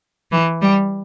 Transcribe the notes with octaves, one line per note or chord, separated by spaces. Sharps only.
E3
G3